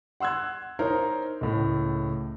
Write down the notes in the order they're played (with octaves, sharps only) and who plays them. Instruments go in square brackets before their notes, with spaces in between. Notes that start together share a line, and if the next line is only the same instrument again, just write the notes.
[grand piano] F#5 C6 E6 F#6 G#6
D#4 A#4 C5 C#5
C#2 A2